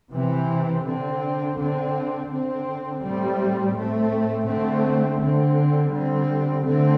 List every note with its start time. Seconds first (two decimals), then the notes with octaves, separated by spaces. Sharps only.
0.11 C3 E3 C4
0.84 D3 C4
1.57 D3 C4
2.28 D3 C4
3.02 A2 G3 C4
3.74 A2 A3 C4
4.46 D3 A3 C4
5.19 D3 C4
5.92 D3 G3 C4
6.65 D3 A3 C4